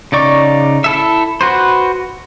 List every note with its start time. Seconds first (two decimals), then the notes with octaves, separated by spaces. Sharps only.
0.12 C#3 D#4 D5 C#6
0.84 E4 A4 E5
1.41 F#4 B4 C5